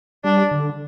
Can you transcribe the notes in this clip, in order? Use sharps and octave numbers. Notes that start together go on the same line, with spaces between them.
G3 D4
D3